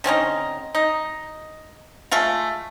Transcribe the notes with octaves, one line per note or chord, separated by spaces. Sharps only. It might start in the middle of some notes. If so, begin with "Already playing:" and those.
D3 C4 C#4 D#4
D#4
G#3 A3 F4 F5